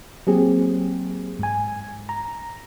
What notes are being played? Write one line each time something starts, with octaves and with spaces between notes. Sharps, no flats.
F#3 A#3 C4 G4 G#4
G#2 G#5
A#5